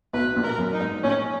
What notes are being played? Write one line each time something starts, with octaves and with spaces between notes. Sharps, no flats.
B1 B2 B4
A#1 A#2
A#4
F#2
D#4
G#2
A#1 A#2 C#4